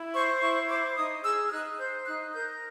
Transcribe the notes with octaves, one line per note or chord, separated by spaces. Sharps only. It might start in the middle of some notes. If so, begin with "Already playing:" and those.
Already playing: E4
C5 C#6
E4 C#6
C5 D6
D#4 D#6
G#4 E6
F6
D#4 F#6
C5 G6
D#4 F#6
A#4 G6